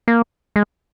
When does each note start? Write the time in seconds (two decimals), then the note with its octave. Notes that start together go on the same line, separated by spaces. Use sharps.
0.08 A#3
0.56 G#3